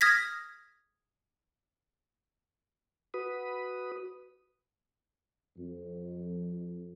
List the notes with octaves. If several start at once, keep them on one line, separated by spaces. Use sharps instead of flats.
D#6 F6 G#6 A#6 B6
F#4 B4 B5 D#6
F2